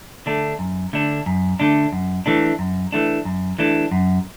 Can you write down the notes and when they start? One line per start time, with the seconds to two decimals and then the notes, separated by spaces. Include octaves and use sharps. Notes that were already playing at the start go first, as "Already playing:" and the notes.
0.26 D3 A3 D4
0.59 F#2
0.93 D3 A3 D4
1.26 F#2
1.60 D3 A3 D4
1.93 F#2
2.26 E3 A3 D4
2.59 F#2
2.92 E3 A3 D4
3.25 F#2
3.59 E3 A3 D4
3.92 F#2